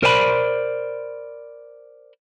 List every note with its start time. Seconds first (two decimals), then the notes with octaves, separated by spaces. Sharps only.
0.03 A#4 C5 D5 G#5 B5